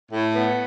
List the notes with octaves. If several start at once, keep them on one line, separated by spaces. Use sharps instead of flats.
A2
B3